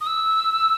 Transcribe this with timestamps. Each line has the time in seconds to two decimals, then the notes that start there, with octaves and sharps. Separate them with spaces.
0.01 D#6
0.07 E6